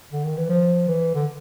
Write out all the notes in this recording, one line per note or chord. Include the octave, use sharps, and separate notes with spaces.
D3
D#3
E3
F3
E3
D3